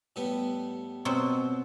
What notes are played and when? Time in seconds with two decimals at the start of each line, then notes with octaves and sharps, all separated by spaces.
0.16 A2 G3 B3
1.05 B2 F#3 C4